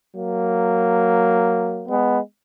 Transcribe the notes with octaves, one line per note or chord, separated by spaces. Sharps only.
F#3 A#3
G#3 B3